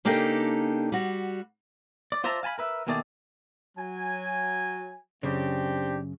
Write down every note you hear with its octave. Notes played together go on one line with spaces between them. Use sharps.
C#3 A#3 D4 D#4 G4 A4
G3 F#4
D5
F4 C5 D5 E5 A5 A#5
F5 G#5 A5 B5
A#4 B4 E5
D#2 B2 D#3 A3 G#4 D5
F#3 G#5
F#2 C#3 C4 D4 G4